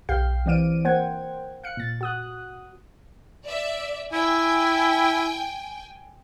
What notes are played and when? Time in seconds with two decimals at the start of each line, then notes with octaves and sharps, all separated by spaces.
0.09 B1 G4 F5 G6 C7
0.46 E3 C4 D5 F5 D7 D#7
0.85 A#3 C5 F#5 G5 G#6
1.64 F5 F#6 C#7
1.77 A#2 A6
2.01 F#4 D#6 F#6
3.46 D5 E5
4.13 E4 G5 G#5